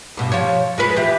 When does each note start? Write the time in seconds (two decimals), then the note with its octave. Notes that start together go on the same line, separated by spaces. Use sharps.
0.17 G2 B2
0.32 F3 C#5
0.78 G#3 F4 B4
0.96 E3 G4